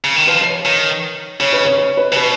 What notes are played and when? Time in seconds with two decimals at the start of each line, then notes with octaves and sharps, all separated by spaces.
0.04 C#3
0.16 D#3
0.27 F3 B4
0.41 B4
0.46 C#5
0.65 D#3 C#5
1.40 C#3 C#5
1.52 B4
1.65 C#5
1.78 C#5
1.97 B4
2.12 C#3
2.16 B2 B4